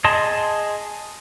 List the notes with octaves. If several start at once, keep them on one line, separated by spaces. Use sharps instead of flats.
G#4 D#5 A5 C6